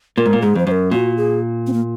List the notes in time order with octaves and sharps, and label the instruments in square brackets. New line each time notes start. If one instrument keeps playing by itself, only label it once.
[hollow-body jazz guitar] A#2 [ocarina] A#4
[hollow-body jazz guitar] G#2
A#2
[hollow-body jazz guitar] G#2 [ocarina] G#4
[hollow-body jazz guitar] F2 [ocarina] C5
[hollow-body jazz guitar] F#2 [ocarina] C5
[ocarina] A#4
[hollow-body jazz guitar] A#2 [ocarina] F#4
[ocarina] G#4
C4
A#3